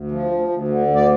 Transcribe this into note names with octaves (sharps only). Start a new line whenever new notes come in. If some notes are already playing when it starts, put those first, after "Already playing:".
Already playing: D2
F3
D2
D2
D3
D2
D5